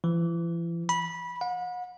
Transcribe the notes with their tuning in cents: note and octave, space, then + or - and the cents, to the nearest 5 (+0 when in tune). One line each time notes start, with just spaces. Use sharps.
E3 +40
B5 -20
F#5 -40